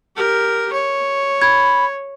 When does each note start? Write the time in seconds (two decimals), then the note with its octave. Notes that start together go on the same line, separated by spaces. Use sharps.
0.16 G4 A#4
0.73 C#5
1.42 B5 G#6